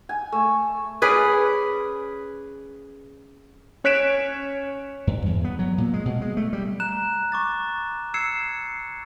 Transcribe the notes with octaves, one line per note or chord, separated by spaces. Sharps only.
G#5
A3
C#4 G#4 B4 D5
C#4 C#5 F#6 B6 D7 E7
G2
E2
B3
F#3
A#2
G#3
B2
G#3
A3
G3
A#5 F#6 E7
C#6 D6 A6
E6 G#6 C7 C#7 E7